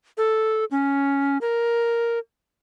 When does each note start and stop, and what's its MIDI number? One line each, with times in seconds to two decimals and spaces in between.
0.17 0.65 69
0.71 1.38 61
1.41 2.19 70